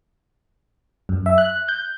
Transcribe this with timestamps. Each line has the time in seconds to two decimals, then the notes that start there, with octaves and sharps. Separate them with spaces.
1.09 F#2
1.26 E5
1.38 F#6
1.68 G6